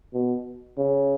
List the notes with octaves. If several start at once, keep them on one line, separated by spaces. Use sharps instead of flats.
B2
C#3